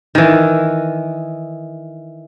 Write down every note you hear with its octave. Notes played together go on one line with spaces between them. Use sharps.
D#3 E3